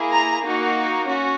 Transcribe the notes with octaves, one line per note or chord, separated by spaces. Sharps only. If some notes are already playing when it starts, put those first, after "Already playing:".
Already playing: A#3 E4 G#4
A#5
A#3 D#4 F#4
C#4 F#4